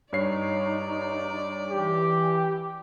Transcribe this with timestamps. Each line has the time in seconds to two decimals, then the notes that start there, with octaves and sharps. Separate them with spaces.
0.13 G2 D#4 C#5 D5 C7
1.70 E3 G4